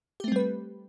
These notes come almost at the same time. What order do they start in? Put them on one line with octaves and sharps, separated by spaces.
G4 A3 C4 G3 B4